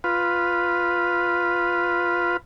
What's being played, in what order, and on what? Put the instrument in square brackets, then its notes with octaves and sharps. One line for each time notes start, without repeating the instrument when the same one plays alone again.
[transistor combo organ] F4 B4